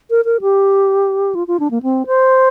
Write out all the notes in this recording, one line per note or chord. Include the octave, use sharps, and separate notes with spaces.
A#4
A#4
G4
F4
F4
D4
A#3
C4
C5